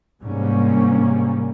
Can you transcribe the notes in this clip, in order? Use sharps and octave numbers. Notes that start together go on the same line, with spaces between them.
G#2 C3 G3 A#3 C#4